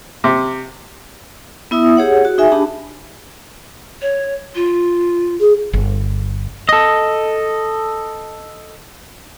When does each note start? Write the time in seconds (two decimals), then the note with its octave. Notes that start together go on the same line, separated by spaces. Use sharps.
0.24 C3
1.71 B3 E4 E5 D#6 E6
1.97 G4 G#4 C#5 F#5
2.25 F#4
2.38 D#4 G#4 E5 G#5
2.52 D4 G4 A5 B5
4.02 C#5
4.55 F4
5.40 G#4
5.73 G1
6.69 A4 D#5